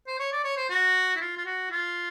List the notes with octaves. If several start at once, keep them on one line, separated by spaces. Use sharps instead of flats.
C5
C#5
D5
C#5
C5
F#4
E4
F4
F4
F#4
F4